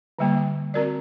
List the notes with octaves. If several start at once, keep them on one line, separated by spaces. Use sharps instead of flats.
D3 G3 A#3
C4 F#4 A#4 D5